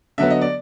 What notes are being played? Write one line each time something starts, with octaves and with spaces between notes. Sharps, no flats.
D3 F#3 B3 E5
D#5
D5